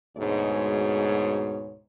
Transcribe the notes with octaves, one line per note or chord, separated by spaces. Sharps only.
D2 G#2 B2 G#3 C#5